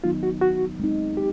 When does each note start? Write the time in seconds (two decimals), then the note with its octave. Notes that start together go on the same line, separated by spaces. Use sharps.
0.04 D#3 F#3 B3 D#4 F4
0.23 F#4
0.41 F#4
0.79 G#3 C4 D#4
1.17 G4